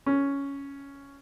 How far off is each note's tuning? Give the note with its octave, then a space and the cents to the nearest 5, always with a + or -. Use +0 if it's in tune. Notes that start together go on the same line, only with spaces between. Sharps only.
C#4 +5